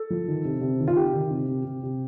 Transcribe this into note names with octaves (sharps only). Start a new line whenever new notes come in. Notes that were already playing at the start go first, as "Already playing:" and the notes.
Already playing: A4
F3
D#3
C3
C3
D#3
F4
C3 G4
D#3
C3
C3
C3
C3